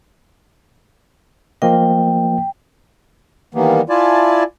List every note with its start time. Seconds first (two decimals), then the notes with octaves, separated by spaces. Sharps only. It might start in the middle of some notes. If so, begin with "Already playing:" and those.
1.62 F3 A#3 D#5 G5
3.55 D#3 E3 G3 A#3 B3
3.90 E4 F4 D5 G#5 A5